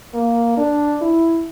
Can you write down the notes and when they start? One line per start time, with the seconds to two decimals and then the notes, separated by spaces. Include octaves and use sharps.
0.14 A#3
0.57 D4
1.02 E4